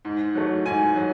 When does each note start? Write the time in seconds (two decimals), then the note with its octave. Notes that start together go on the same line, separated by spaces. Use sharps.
0.05 G#2
0.35 F#3 A3
0.66 G#2 G#5
0.96 F#3